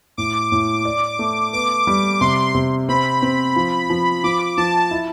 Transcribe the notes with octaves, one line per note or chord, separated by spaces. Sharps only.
A2 D6
A2
D5
A3
B3 D6
G3 D6
C3 C6
C3
C4 B5
C4
F3
F3
F3 D6
F3 A5
E4